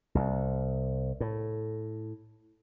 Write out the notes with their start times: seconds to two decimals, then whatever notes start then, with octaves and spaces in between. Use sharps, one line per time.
0.15 C2
1.20 A2